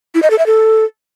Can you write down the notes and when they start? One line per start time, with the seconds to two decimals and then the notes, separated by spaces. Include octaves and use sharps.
0.15 E4
0.23 D#5
0.30 A4
0.38 E5
0.46 A4